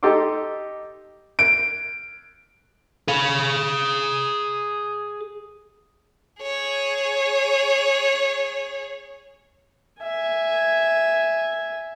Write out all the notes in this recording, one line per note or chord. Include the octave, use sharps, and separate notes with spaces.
D#4 G4 A4 D#5 C6 D6
D7
G#4 F5
G#4 C#5
E5 G#5